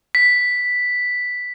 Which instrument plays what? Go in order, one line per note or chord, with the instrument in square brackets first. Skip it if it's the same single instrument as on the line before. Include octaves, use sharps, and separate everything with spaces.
[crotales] B6